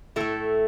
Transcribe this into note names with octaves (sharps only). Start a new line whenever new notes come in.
A2 A3 E4 A4